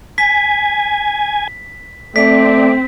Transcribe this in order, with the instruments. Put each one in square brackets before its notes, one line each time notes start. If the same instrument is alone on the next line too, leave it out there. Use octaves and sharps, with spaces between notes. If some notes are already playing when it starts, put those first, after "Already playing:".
[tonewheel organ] G#5 [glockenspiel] B6
[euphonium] A3 [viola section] C4 [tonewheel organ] D5 [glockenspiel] B6